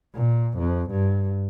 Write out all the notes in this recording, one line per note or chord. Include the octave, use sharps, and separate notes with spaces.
A#2
F2
G2